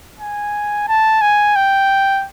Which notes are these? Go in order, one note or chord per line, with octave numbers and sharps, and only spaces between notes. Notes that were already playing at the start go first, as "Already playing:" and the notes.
G#5
A5
G#5
G5